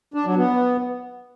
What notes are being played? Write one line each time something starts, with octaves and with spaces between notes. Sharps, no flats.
D4
F#3
B3